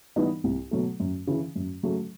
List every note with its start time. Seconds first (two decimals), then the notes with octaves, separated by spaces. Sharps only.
0.16 E3 G3 B3 D#4
0.44 C2
0.71 B2 F#3 A3
1.00 F#2
1.27 C#3 E3
1.55 F#2
1.83 C#3 F#3 A3